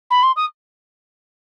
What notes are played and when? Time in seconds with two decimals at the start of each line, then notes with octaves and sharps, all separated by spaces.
0.10 B5
0.23 C6
0.36 D#6